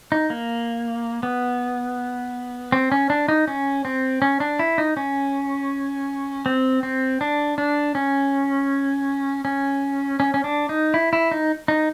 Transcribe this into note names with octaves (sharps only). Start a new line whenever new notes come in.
D#4
A#3
B3
C4
C#4
D4
D#4
C#4
C4
C#4
D4
E4
D#4
C#4
C4
C4
D4
D4
C#4
C#4
C#4
C#4
D4
D#4
E4
E4
D#4
D#4